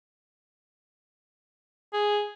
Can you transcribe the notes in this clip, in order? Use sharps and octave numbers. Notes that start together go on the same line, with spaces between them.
G#4